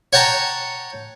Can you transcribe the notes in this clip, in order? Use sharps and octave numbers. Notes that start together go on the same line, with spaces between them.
C#5 F#5 G5 A5 A#5